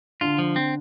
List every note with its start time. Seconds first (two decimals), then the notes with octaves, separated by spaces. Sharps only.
0.21 D3 F4
0.38 F3
0.56 C4